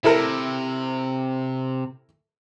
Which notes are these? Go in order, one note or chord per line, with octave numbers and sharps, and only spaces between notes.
C3 E4 A4 A#4